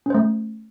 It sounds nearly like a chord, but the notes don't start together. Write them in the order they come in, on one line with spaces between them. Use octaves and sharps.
C#4 C5 A3